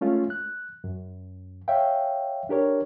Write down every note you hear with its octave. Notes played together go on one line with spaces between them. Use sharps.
G#3 A3 C#4 F4
F#6
F#2
C#5 E5 F5 G5
D4 G4 A#4 C#5